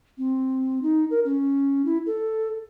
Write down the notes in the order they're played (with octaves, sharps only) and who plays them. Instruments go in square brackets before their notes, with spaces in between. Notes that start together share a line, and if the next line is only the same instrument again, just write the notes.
[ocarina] C4
D#4
A#4
C#4
E4
A4